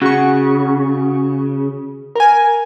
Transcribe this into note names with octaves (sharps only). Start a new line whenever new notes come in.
C#3 F#4 C#6
A#4 G#5